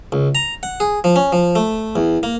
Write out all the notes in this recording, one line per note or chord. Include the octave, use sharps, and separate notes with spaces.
C#2
A#5
F#5
G#4
F3
C#4
F3
A3
E2
A#3